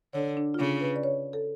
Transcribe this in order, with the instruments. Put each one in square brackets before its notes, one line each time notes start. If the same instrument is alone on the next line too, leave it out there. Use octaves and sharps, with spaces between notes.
[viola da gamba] D3 [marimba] C#5
[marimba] D4
F4
[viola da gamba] C#3 [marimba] D4
[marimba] B4
D5
C#5
A4